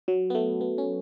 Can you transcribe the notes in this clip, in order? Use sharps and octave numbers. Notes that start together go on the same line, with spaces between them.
F#3
B3
A3
B3
C#4